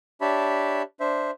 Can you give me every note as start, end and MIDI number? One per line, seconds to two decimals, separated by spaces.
0.21 0.82 62
0.21 0.82 67
0.21 0.82 73
0.21 0.82 76
0.21 0.82 81
0.21 0.82 83
1.00 1.31 62
1.00 1.31 72
1.00 1.31 76